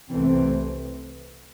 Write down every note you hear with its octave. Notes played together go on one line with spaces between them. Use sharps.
C2 C3 E3 A3 C4